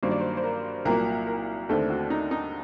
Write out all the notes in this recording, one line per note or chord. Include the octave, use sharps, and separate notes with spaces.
G2 D#3 F#3 A#3 C5
D5
C5
C5
A#4
C2 A#2 F#3 A#3 A#4
A#4
D#2 D3 A3 C4 A4
F#4
D#4
D#4